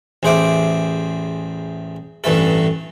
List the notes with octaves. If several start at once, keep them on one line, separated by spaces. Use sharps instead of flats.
A1 E2 G#4 C5 E5 D6
A1 G2 E3 A3 A4